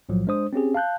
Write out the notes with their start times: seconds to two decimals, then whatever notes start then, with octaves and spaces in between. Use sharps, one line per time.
0.09 B1 A2 F3 F#3
0.27 G#3 D4 C5 D#6
0.53 C4 C#4 G4 G#4
0.74 F5 A5 F#6 G6